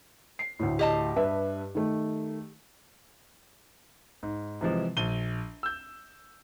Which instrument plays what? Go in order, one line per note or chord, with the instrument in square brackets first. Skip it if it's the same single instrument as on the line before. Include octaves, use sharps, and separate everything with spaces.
[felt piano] C7
D2 A2
[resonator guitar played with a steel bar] G4 D#5 A5
[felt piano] G2 B4 E5
D#3 A3
[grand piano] G#2
C3 E3 F3 G#3
A#1 D#7 G7
E6 G6